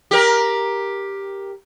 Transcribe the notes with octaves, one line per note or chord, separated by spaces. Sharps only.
G4 A#4